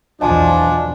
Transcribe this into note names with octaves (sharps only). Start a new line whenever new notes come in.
B1 E2 F3 D4 D#5 G#5 A5